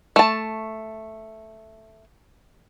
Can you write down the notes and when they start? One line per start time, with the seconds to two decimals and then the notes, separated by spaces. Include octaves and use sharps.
0.16 A3 A5